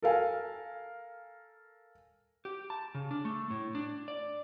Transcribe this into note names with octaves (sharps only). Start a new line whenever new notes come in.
A4 A#4 F5 G#5
G4
A5
C#3
D4
A3
A2
D4
D5